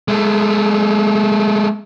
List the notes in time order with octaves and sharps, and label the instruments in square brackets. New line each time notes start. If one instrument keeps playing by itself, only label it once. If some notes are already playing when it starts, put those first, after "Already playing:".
[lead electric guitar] G#3 A3